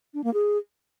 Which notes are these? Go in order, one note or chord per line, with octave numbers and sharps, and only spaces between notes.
D4
A#3
G#4